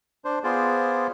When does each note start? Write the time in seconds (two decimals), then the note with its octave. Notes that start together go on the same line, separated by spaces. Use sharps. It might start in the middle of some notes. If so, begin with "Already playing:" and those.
0.25 D4 C5
0.44 B3 F4 G#4 C5 D5